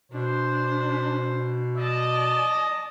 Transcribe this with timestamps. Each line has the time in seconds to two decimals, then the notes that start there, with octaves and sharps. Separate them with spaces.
0.12 B2 D4 C5
1.77 D5 D#5 A5